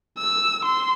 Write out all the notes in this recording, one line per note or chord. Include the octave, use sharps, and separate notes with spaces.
E6
C6